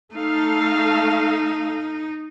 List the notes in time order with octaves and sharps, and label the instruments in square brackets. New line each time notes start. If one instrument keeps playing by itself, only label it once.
[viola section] A3 A4 F5 [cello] D#4